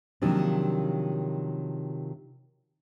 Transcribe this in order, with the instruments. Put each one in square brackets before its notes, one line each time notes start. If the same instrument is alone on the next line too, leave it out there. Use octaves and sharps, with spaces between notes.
[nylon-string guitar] C3 D#3 F3 F#3 A#3 D4